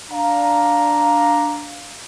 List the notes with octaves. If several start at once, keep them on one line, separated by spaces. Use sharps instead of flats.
D4 F5 A#5